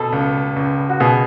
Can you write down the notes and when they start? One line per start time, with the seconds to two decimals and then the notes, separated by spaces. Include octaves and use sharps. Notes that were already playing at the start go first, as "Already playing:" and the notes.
Already playing: B2 A4
0.12 C#2
0.56 C#2
0.90 F#4
1.00 B2 G#4